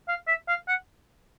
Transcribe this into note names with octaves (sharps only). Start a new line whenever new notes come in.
F5
E5
F5
F#5